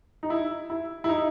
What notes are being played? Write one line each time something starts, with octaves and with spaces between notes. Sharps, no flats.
D#4
E4
E4
E4
D#4